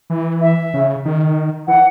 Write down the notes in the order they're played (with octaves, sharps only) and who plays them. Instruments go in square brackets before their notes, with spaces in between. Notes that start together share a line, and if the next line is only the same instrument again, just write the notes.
[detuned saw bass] E3
[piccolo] E5
[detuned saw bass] C#3
D#3
[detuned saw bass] E3 [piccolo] F#5